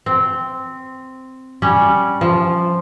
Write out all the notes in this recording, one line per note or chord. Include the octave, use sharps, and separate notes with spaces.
C4
G3 C#4
F3